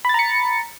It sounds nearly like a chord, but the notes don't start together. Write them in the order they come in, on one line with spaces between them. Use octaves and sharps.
B5 A6 A#5 C#7